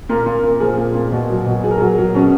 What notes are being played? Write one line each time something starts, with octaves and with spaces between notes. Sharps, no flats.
A#2 A#4
A#2
A#2
F3 G#4
A#2
A#2
B2
F#3
B2
F#3 G#4
A#4
F#3 G#4
F#3
B2 C#4